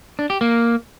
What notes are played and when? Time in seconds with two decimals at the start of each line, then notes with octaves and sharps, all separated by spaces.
0.19 D4
0.30 G4
0.41 A#3